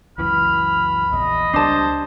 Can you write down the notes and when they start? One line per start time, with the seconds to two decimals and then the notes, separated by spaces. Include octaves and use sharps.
0.18 C#2 F#2 E3 B5 F6
1.13 A#1 E2 D#5
1.53 C#2 G3 D4 C5 A5